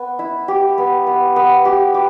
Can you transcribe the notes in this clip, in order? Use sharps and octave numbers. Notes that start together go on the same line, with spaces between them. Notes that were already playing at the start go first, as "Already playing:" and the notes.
Already playing: B3
E4
G4
B3
B3
B3
G4
G4